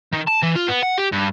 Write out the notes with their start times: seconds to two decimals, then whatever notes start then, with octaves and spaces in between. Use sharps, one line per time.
0.13 D#3
0.28 A5
0.43 E3
0.56 F4
0.69 B3
0.83 F#5
0.98 G4
1.12 G2